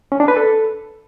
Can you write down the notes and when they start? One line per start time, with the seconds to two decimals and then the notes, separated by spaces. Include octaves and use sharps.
0.12 C#4
0.20 D4
0.28 B4
0.36 A4